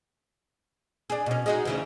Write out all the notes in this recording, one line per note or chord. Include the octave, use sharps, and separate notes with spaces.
D4 G#4
B2 C#4
G#3 D#4 F#4
D2 C#3 E3